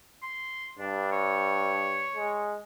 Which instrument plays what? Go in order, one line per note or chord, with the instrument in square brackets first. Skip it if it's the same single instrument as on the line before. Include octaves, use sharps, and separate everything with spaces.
[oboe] C6
[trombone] G2 [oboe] D4
[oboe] C#5
[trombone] G#3